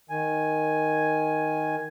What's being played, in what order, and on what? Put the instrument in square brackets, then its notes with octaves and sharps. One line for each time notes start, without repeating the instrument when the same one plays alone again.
[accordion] D#3 G#5